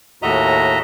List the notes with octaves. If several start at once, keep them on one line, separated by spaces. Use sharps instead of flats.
D#2 A2 F#4 D#5 E5 A#5